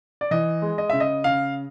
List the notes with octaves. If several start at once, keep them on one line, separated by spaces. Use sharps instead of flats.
D5
E3 D#5
G#3
D#5
C#3 E5
D#5
C#3 F5